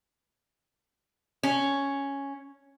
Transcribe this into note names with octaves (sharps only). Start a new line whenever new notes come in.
C#4